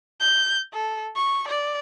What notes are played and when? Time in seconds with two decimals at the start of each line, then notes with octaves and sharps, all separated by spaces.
0.20 G6
0.74 A4
1.16 C#6
1.48 D5